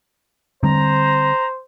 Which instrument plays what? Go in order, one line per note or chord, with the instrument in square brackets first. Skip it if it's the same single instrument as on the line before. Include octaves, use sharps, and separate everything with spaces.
[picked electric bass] D3 G3 C4 [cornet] C5 [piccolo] A#5